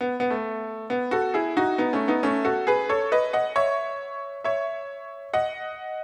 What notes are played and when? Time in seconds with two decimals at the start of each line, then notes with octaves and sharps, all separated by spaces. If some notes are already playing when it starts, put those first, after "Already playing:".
0.01 B3
0.20 B3
0.30 A3
0.90 B3
1.11 F#4 A4
1.34 E4 G#4
1.57 D#4 F#4
1.78 B3 D#4
1.93 A3 C#4
2.08 B3 D#4
2.23 A3 C#4
2.45 F#4 A4
2.67 G#4 B4
2.89 A4 C#5
3.12 B4 D#5
3.33 D#5 F#5
3.56 C#5 E5
4.44 C#5 E5
5.34 D#5 F#5